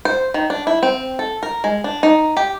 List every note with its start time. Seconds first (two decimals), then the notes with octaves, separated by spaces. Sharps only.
0.05 C5
0.34 D#3
0.50 D4
0.67 E4
0.83 C4
1.19 A4
1.43 A#4
1.64 G#3
1.84 D4
2.03 D#4
2.37 G4